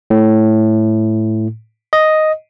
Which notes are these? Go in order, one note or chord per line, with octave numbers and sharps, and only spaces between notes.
A2
D#5